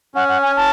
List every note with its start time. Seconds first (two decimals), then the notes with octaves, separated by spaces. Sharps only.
0.15 C#4 F#5
0.28 F#5
0.42 G#5
0.56 A5